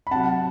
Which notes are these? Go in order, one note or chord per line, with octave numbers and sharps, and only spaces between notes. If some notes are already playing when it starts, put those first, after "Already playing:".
B5
C3 F#3 F#5 A5